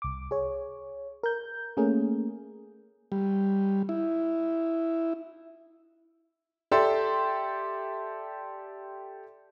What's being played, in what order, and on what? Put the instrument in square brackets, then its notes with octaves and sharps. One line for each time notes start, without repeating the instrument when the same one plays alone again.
[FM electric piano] C2 D6
G#4 C#5
A#4 G6
A3 A#3 C#4 G#4 A#4
[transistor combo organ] G3
E4
[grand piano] G4 A4 D5 E5 C6